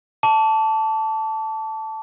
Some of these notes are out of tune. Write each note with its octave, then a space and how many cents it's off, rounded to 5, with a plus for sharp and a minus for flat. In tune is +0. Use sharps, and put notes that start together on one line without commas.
A5 +0 D6 -40